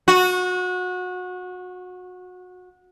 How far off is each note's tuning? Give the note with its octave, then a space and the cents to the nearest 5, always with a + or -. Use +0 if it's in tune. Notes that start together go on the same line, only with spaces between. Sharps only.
F#4 -25